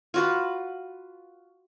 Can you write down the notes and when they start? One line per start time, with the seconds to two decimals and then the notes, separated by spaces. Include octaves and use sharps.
0.14 F4 F#4 B4